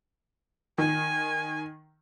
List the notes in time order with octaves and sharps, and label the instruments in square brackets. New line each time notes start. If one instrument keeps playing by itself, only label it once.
[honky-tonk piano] D#3 [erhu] G#5